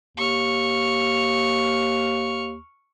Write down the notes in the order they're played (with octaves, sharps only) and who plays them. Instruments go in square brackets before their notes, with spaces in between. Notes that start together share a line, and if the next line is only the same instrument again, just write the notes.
[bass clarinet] D#2 [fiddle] C#6 F6